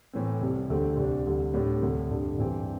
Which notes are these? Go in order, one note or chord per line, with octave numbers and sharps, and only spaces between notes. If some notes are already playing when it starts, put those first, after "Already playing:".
A2 E3 A3 C4
C2 C3 G3
D2 D3 A3 C4 G4
C2 C3 G3 D4
D2 C3 G3
A2 G3 D4 G4
D2 C3 A3
G2 D3 G3
G2 E3 C4 G4